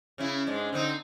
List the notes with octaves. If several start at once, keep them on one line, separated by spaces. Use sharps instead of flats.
C#3 C#4 E4
G#2 G#3 D4
D3 C4 D#4